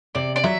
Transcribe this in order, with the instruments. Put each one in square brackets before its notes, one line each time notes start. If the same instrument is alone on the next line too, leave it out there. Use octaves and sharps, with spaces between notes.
[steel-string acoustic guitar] C3 [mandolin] D5
[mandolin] D5
[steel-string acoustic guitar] F#3 [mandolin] E5